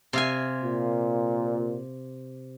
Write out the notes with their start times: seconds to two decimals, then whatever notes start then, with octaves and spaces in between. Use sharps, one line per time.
0.13 C3 F5 G#5
0.63 A#2